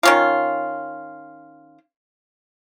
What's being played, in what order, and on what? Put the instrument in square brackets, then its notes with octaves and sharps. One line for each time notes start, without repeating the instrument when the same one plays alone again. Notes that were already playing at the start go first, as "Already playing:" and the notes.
[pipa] D#3 C#4 F4